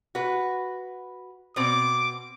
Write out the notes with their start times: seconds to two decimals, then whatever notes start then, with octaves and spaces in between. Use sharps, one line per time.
0.15 F#4 B4
1.56 B2 C4 D6